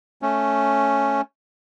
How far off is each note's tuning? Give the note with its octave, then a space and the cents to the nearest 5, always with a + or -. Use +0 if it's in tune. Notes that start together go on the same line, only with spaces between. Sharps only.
A3 +0 C#4 +0